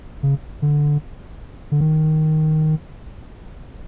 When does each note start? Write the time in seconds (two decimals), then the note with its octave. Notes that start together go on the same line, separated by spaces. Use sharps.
0.23 C#3
0.62 D3
1.72 D3
1.80 D#3